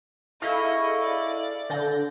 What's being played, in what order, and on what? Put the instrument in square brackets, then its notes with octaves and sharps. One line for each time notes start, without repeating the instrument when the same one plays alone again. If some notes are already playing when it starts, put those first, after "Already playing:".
[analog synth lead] E4 [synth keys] G#4 A4 F5 [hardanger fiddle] D#5 C#6
[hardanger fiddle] D5
[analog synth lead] D3 [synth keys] G6 A6 A#6